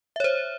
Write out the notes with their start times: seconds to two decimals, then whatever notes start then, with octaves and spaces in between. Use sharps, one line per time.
0.16 E5
0.20 C#5
0.24 C5